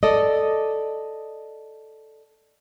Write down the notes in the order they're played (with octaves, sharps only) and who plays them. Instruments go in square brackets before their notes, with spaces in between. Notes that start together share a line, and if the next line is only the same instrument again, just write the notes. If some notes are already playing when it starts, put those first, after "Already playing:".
[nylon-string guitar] A4 D5 D#5